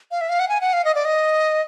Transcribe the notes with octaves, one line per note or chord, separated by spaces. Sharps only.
F5
E5
F5
F#5
G#5
F#5
F5
D#5
D5
D#5